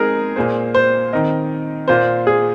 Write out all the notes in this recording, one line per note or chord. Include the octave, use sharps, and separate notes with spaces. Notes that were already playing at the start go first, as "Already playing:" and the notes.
Already playing: G#3 C4 D#4 G#4 A#4
A#2 A#3 G#4 C5
C5
D#3 C4 D#4 A#4 D#5
A#2 A#3 F4 C5
G#4